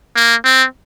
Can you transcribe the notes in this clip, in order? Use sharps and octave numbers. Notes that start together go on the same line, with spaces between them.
A#3
C4